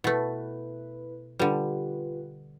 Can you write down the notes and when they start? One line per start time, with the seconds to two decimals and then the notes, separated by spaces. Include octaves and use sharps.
0.04 B2 A3 E4 B4
1.39 D3 G3 F4 G4 B4